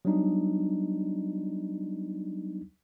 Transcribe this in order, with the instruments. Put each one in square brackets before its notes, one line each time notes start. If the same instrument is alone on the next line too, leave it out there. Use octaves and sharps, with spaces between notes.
[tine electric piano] F#3 G3 B3 D4 D#4